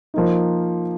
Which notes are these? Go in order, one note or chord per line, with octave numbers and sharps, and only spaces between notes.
F3 A#3 D#4